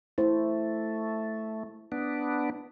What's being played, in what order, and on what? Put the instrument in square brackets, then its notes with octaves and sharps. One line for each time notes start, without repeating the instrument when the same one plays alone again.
[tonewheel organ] A3 [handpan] E4 C5
[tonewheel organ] B3 D4